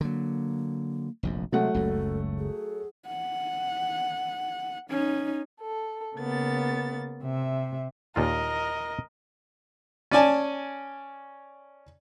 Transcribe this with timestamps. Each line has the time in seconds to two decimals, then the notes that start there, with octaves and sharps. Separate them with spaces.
0.01 D3 F#3 A#3
1.23 F1 A#1 F#2
1.52 C3 F#3 G#3 A3 E5 F#5
1.74 F#1 C#2 F#2 A4
2.39 G#4
3.07 F#5
4.90 C#4 D#4
5.61 A4
6.17 C#3 A#3 B3 A6
7.22 C3 E5
8.16 D#2 A#2 F4 A#4 D#5
10.11 C#4 D5 G#5 A5